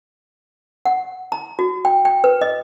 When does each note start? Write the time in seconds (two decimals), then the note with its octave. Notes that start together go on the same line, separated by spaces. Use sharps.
0.85 F#5
1.32 A#5
1.59 F#4
1.85 G5
2.05 G5
2.24 B4
2.41 D#5